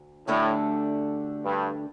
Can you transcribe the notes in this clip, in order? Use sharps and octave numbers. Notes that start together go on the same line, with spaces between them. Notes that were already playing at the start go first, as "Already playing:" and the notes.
Already playing: D2
D2 A2 D3 A3 D4 G4
G2